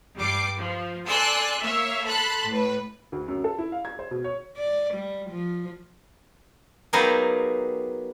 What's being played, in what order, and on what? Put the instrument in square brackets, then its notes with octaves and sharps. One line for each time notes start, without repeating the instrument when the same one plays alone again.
[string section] G2 G3 D6 C7
F3
A4 D5 G#5 C6 E6 F#6
A#3 C#5 E5 F5
A4 A5 B5 C6 F#6
A2 B4
[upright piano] D2
F#2
A4
E4
F5
G#6
C5
B2
C#5
[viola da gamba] D5
G3
F3
[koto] F#3 A#3 B3 D#4 G4 G#4